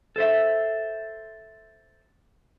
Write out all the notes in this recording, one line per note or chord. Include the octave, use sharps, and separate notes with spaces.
A4 C5 E5